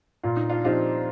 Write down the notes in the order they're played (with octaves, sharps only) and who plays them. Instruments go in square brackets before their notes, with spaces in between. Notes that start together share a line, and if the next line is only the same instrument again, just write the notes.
[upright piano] A#2 [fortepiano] F4
[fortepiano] D#4
D4 F4
[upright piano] F3 C4 D#4 G4 [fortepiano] D4 F4